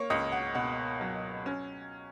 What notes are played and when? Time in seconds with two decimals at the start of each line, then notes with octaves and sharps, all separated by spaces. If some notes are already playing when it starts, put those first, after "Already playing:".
Already playing: A#3 C#5
0.10 C#2 D#5
0.32 F#5
0.55 B2 F#5
1.01 F#3
1.46 C#4